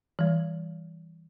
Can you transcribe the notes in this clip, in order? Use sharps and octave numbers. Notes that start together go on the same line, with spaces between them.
E3 G3